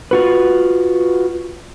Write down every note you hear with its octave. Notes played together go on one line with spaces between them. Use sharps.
F4 F#4 B4